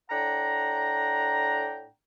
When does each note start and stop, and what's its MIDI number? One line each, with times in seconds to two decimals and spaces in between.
0.10 1.87 45
0.10 1.87 62
0.10 1.87 78
0.10 1.87 79
0.10 1.87 82